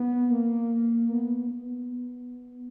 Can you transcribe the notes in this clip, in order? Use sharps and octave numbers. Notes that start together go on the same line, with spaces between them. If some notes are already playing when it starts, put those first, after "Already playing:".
Already playing: B3
A#3
B3
B3